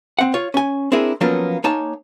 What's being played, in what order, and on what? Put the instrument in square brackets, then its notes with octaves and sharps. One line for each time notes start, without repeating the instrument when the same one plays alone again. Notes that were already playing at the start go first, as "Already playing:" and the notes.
[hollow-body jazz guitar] C4 F#5
F4 C#5
C#4 G#5
C4 D4 E4 G#4 A#4
F3 F#3 A#3 B3 C#4 F4
A#3 D#4 C#5 G#5 A5